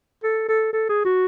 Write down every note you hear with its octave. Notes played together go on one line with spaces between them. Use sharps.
A4
A4
A4
G#4
F#4